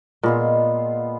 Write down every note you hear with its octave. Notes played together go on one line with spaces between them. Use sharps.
A#2 G#3 B3 F4